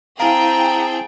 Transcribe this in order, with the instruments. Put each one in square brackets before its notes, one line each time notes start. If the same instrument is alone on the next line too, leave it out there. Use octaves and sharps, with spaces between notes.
[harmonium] C4 A5 [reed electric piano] E4 F5 [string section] G#4 G5 [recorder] A#5